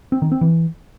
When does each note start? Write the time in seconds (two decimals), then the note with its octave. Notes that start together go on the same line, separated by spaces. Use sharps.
0.12 C4
0.22 D#3
0.32 C4
0.41 E3